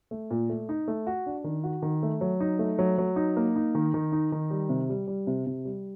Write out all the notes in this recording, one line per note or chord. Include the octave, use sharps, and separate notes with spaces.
A3
A#2
A3
D#4
A3
F#4
D4
D#3
F#4
D#3
A3
F#3
D#4
A3
F#3
F#3
D#4
A#3
D#4
D#3
D#3
D#4
D#3
G3
C3
G3
G3
C3
C3
G3